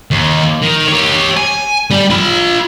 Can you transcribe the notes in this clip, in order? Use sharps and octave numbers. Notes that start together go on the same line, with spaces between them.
D#2
D#3
G4 C#5
G#5
G3
F4 B5